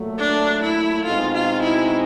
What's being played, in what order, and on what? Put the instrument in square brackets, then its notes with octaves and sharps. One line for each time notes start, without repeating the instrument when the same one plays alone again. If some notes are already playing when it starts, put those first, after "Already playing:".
Already playing: [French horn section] A#2 F#3 A3
[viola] D4
E4
[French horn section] B2 G#3 C4 D#4 F#4 [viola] F4
[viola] F4
E4